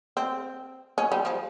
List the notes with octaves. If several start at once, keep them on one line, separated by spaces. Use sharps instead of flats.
C4
C#4
G3
F3